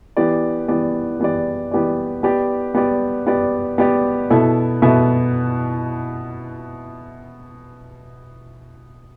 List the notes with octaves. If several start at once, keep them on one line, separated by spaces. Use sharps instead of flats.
E3 B3 G4 D5
E3 B3 G4 D5
E3 B3 G4 D5
E3 B3 G4 D5
B3 G4 D5
B3 G4 D5
B3 G4 D5
B3 G4 D5
B2 B3 E4 A4 E5
B2 B3 E4 A4 E5